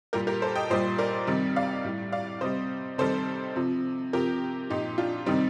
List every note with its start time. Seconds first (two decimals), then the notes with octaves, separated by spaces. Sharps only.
0.13 A#2 G3 G4 A#4
0.27 G4 A#4
0.42 A4 C5
0.56 D#5 G5
0.70 A#2 G3 C5 D#5
0.98 A#4 D5
1.27 C3 D#3 G3
1.56 D5 F5
1.84 A2 G3
2.12 D5 F5
2.41 C3 G3 C5 D#5
2.98 C3 D#3 G3 A4 C5
3.56 C3 F3
4.13 C3 F3 G4 A#4
4.69 A#2 F3 D#4 G4
4.98 D4 F4
5.26 C3 D#3 G3 C4 D#4